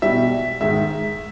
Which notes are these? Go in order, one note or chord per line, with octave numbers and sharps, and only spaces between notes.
B2 G3 E5
G#2 D#3 G#3 E5